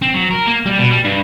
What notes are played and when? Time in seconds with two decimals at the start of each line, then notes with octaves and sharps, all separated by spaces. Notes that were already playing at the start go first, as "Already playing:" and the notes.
0.02 C4
0.14 F#3
0.31 A#4
0.47 A#3
0.66 G3
0.79 B2
0.90 G3
1.04 G2